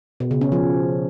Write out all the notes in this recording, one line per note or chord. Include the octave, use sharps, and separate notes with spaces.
B2
C#3
C#4
F3